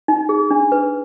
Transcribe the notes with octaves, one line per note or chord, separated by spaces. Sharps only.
D#4
G#4
D4
B4